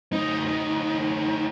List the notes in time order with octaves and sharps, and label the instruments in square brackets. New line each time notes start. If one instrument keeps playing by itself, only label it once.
[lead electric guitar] D2 D#4